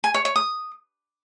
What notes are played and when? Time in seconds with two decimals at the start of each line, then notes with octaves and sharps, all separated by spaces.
0.04 G#5
0.14 C#5
0.25 C#5
0.36 D#6